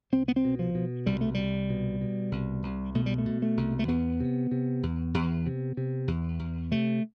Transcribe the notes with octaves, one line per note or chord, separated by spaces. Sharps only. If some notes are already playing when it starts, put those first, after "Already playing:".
C2 C4
B3
C4
B2
F3
B2
C2 G3
A3
C2 G3
B2
B2
C2
C2
B2 A3
G3
A3
B2
A3
C2
A3
E2 B3
C3
C3
E2
E2
C3
C3
E2
E2
C3 A3